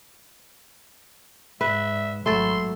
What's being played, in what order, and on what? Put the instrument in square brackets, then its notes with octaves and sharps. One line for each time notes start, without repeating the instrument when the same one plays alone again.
[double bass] G#2 [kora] B4 [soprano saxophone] E5
[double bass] G#1 F#3 [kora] A3 A4 [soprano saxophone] C6